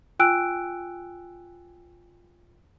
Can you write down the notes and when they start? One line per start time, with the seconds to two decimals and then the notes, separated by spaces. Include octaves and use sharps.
0.19 F4 G5 G#5 E6 F#6 D7